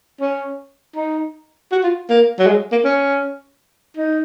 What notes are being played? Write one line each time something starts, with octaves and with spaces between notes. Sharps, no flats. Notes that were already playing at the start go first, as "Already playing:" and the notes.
C#4
D#4
F#4
F4
A#3
F#3
G#3
A#3
C#4
D#4